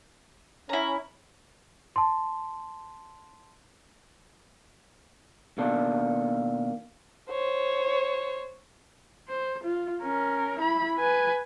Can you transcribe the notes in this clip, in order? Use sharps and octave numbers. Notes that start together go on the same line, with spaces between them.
C#4 E4 A#5
A5 C6
B2 D#3 A#3 D4 A4
C5 C#5
C5
F4
C#4 A#4
E4 B5
B4 G#5